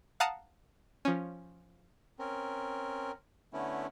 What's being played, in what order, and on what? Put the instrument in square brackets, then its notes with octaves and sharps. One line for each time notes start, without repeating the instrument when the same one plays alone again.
[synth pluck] F5 F#5 A5 A#5 D#6 F6
F3 C#4
[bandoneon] C4 C#4 A#4
D3 A3 B3 C#4 E4